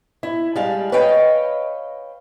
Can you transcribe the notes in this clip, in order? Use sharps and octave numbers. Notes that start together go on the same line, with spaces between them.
E4
G3 G#3 F5 A5
B4 C#5 D#5 F5 G5